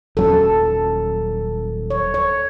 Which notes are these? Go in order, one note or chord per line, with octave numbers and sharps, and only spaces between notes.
D#1 F#3 C#4 A4
C#5
C#5